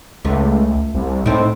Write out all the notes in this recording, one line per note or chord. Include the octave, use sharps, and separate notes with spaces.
C#2 A3
C2
A2 C4 D#4